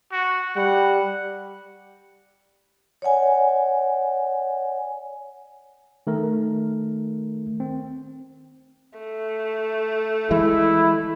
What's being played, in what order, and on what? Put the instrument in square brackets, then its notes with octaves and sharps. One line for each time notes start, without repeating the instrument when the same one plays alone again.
[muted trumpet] F#4
[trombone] G3 [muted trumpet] F#5
[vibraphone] C#5 D5 F#5 G#5
[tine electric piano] D#3 A3 A#4
C4
[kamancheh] A3
[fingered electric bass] E3 G#3 [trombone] E4